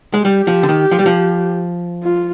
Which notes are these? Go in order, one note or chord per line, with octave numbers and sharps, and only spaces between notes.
G#3
G3 G4
F3
D3
D#3
F3
G3
F3
F4